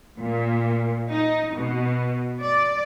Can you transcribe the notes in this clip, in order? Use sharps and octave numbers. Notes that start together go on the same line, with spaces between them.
A#2
D#4
B2
D5